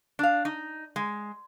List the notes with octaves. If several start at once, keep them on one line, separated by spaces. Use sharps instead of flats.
D4 F5
D#4
G#3